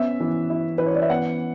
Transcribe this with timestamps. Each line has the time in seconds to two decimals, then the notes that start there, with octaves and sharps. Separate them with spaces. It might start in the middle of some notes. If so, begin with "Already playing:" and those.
Already playing: B3 C#4 E5
0.20 E3
0.50 E4
0.78 E3 B4
0.86 C#5
0.94 D5
1.02 E5
1.10 B3 F#5